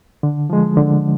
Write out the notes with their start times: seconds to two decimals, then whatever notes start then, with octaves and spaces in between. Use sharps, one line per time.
0.23 D3
0.50 F3 G#3
0.77 D3